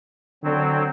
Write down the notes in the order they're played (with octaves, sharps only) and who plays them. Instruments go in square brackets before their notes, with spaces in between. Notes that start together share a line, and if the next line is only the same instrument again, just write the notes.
[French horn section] D3 [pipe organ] F#3 C4